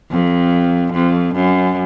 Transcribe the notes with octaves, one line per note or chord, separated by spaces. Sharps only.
F2
F2
F#2